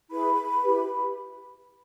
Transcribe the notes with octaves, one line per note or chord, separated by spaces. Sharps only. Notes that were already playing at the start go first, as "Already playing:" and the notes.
E4 G#4 B4 B5
E4 G4 B4